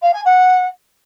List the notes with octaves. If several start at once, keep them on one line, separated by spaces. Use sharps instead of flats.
F5
G#5
F#5